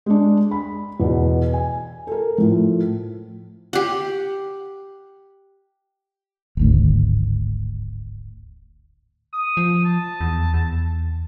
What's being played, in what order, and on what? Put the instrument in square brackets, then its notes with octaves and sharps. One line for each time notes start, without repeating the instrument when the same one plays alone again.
[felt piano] G#3 D4
B5
E2 B2
G#5
A4 A#4
A2 F3
[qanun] G4 F#5
[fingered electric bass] D1 G#1 D2
[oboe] D#6
[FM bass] F3
[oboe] A5
[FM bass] E2
E2